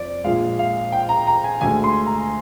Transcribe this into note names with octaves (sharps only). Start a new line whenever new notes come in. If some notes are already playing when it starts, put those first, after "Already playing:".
Already playing: F2 D5
A#1 A#2 G#3 F5
F5
G5
A#5
A#5
G#5
D2 D3 G#3 G#5
C6
A#5